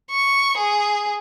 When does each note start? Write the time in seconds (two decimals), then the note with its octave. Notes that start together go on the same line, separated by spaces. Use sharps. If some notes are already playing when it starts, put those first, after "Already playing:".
0.10 C#6
0.57 G#4